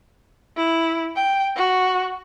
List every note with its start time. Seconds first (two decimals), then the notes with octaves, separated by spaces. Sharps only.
0.57 E4
1.16 G5
1.56 F#4